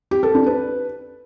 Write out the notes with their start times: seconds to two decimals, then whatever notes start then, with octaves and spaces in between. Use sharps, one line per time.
0.11 G4
0.23 A4
0.35 D4
0.46 B4